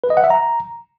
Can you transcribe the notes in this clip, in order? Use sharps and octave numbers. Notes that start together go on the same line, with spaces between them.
B4
D#5
F#5
E5
A#5